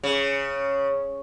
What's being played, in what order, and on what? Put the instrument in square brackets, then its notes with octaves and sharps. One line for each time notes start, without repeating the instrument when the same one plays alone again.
[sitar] C#3